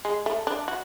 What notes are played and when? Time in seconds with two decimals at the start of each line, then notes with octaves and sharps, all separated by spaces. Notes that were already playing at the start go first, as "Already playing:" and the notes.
0.05 G#3
0.26 A3
0.47 D4
0.68 F#4